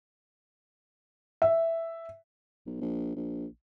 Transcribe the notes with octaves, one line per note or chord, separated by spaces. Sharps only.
E5
B1
A#1
A#1